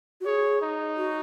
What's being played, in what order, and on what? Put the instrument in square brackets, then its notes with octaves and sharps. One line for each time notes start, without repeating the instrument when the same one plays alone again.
[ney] F#4
[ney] G#4 [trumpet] C#5
[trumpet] D#4
[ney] F#4